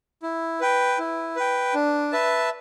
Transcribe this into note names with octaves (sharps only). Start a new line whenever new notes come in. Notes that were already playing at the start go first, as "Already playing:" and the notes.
E4
B4 G5
E4
B4 G5
D4
B4 E5 A5